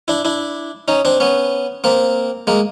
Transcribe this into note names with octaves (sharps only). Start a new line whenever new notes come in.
D4 E4
D4 E4
C#4 D#4
C4 D4
B3 C#4
A#3 C4
G#3 A#3